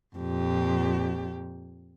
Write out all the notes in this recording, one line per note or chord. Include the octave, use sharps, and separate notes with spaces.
F2 A#2 G4